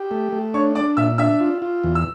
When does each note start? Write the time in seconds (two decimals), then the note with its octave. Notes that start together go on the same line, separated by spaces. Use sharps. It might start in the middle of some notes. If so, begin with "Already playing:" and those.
Already playing: G4
0.11 A3
0.32 A3
0.54 D4 C#5 C#6
0.75 D4 D5 D6
0.97 A#2 E5 E6
1.18 D4 E5 E6
1.40 F4
1.62 F4
1.84 E2
1.95 E6